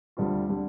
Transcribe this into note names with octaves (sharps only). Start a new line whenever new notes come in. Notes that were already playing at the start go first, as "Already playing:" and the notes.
D2 D3 G3 C4 F4
D3 G3